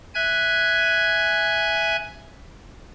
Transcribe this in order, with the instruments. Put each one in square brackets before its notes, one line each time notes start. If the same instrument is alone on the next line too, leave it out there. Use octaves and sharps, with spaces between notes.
[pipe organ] E5 G#5 F#6 G#6